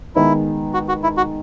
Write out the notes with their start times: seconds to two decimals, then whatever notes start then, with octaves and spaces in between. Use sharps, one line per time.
0.15 D#3 G#3 B3 D#4 E4
0.74 F#4
0.88 F#4
1.03 E4
1.17 F#4